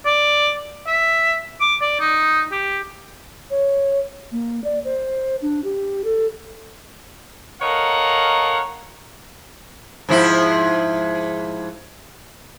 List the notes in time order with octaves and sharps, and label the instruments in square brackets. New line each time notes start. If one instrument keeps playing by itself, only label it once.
[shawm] D5
E5
D6
D5
D#4
G4
[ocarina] C#5
A#3
D5
C5
D4
G4
A4
[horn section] A4 A#4 C#5 D#5 F5 F#5
[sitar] G#2 F3 E4